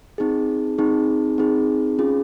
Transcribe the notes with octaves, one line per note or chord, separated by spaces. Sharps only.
C4 D#4 G#4
C4 D#4 G#4
C4 D#4 G#4
C#4 F4 G#4